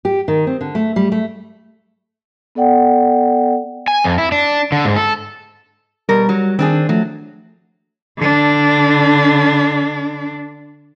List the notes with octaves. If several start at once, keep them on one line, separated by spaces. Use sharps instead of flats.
G4
D#3
C4
D3
A3
G3
A3
B3 A4 D5 F#5 G5
G#5
F2
E4
D4
D3
G#2
A4
B2 G3 A#4
F#3
D#3 C4 D4 G#4
F3 F#3 A3
D3 D4